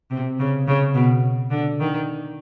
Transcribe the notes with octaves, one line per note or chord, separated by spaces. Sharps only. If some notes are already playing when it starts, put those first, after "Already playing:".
C3
C#3
C#3
B2
D3
D#3